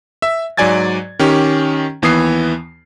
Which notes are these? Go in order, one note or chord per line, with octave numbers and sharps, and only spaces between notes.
E5 E6
G#2 F#3 D5 G#5 G#6 A6
D#3 C#4 G4
D#2 E3 B3 D#6 C7